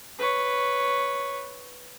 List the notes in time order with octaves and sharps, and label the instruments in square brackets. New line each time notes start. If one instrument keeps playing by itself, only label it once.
[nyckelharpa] B4 C#5